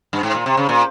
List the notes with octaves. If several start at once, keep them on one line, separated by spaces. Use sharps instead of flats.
G2
G#2
A#2
C3
C#3
A#2